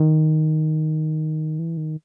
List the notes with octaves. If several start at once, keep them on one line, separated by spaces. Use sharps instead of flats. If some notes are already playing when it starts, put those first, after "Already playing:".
Already playing: D#3
E3
D#3